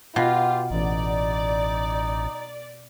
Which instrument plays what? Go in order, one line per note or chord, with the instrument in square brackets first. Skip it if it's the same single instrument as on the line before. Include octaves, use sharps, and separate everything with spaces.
[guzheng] B2 [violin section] F4 [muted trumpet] G4
[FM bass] A1 [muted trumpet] D#4 [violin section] D5